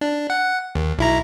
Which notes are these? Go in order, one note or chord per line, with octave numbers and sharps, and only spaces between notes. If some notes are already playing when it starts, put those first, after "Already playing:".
D4
F#5
D#2
B1 E4 A#5